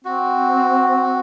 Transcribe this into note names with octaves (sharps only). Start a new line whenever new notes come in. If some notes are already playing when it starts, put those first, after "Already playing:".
C4 F#4